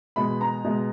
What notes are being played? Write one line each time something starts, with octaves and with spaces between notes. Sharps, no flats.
B2 G#3 B5
A#5
B2 G#3